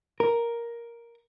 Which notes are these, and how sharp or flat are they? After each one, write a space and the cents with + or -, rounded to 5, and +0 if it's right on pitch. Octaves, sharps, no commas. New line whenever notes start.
A#4 +5